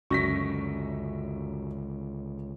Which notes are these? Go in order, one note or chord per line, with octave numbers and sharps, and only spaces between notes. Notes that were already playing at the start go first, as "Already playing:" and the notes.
C#2 F#2 D3 C#6 A#6 B6